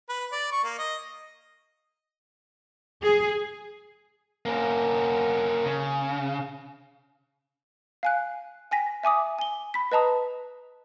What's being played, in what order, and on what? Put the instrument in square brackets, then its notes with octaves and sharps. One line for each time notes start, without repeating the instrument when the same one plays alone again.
[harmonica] B4
D5
C#6
A#3
D#5
[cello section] G#4
[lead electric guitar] A#3 C#4
C#3
[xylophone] F5 G#5 F#6
G5 G#5 A#6 B6
E5 G#5 D6 D#6
G#5 G7
B5 B6
B4 D#5 A5 A#5 D#6